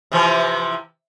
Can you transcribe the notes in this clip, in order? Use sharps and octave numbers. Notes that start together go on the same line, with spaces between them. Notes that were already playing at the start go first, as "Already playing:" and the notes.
C3 E3 F3